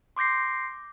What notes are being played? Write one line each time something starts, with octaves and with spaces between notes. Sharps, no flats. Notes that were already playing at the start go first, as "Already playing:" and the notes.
C6 D6 G6 A#6 C7